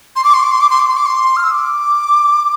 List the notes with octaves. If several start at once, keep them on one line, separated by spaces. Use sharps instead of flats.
C6
D6
C6
D6
C6
D6
C6
D6
C6
D6
C6
F6
E6
D6